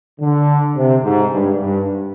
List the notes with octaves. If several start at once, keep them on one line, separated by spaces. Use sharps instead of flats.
D3
C3
G#2
G2
G2